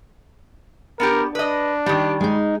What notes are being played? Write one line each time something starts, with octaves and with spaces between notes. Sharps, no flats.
B3 D4 G4 A#4
D4 B4 D#5
D#3 G3 G4
G#3 D#4